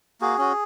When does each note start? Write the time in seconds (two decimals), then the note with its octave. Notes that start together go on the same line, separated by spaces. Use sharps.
0.21 A#3 F#4 G#4
0.38 C#4 F#4